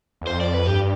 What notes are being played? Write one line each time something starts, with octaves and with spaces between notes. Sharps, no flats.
E2
F2 C5
D5
B4
G2 G4